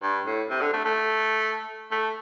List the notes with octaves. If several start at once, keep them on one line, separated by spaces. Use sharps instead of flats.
G2
A2
C3
D3
A3
A3
A3